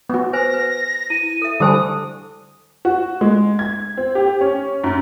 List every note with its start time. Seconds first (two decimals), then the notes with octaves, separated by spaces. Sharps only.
0.10 B3 F#4
0.33 B4 C5 G#5 A#6
0.54 B4
1.10 E4 D#7
1.42 A4 E5
1.60 D3 G3 G4 A4 C5 G#5 D#6
2.85 F#4
3.21 G#3
3.59 G#6
3.97 C4
4.15 G4
4.41 C#4
4.84 F#2